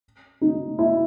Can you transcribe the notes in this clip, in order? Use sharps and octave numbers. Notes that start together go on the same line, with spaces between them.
D#4
E4